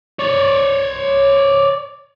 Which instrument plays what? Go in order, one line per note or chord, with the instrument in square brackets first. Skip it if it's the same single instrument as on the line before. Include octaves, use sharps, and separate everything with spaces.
[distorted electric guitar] C#5 D5